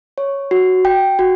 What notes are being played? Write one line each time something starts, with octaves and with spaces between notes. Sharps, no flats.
C#5
F#4
G5
F#4